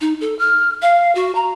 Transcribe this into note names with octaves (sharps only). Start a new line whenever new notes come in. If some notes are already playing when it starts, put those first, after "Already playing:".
D#4
A4
F6
F5
F#4
A#5